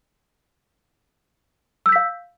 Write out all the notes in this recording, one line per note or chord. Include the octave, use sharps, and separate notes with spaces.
F5 E6 G6 B6